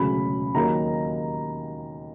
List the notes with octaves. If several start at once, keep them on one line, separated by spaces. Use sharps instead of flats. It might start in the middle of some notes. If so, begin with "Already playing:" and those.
Already playing: E1 D2 C#3 F#3 B5
D#2 D#3 F#3 A#5